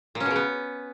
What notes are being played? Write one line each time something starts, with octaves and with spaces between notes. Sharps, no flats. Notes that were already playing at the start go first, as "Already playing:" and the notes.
A#2
C#4
B2
C#3
B3